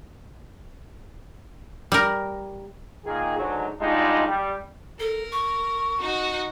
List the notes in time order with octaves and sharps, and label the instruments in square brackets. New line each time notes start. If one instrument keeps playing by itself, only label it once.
[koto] G3 A#4
[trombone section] A#2 D#3 G#4
G#2 D3 F#3
B2 G3 G#3 D4 D#4 F4
G3
[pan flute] A4 [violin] A#4
[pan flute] C#6
[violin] D#4 F#4